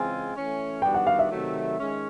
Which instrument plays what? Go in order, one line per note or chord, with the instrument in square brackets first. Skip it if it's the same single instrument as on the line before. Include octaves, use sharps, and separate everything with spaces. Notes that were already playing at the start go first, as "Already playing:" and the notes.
Already playing: [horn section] C#3 E3 G#3 C4 F4 [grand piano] G#5
[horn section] E3 A3 C#4
[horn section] D#3 G3 B3 D4 F#4 [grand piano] G5
[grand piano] F#5
F5
E5
[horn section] C3 D#3 F#3 A3
D#3 G#3 C#4